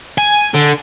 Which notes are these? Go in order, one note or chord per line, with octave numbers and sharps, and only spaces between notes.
G#5
D3